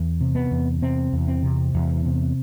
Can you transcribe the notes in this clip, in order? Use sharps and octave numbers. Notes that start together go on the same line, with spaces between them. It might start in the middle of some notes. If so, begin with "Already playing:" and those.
Already playing: E2
C3
B3
E2
C3 C4
E2
C4
C3
E2
C3